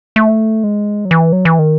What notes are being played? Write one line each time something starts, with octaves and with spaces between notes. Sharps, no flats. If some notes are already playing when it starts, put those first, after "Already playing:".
A3
G#3
F#3
E3
F#3
E3
D#3